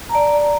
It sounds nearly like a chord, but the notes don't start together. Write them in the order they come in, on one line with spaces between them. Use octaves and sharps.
A#5 A5 D5